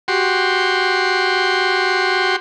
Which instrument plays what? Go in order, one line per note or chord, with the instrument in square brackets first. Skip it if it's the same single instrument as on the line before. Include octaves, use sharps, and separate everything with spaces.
[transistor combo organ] F#4 G4 C6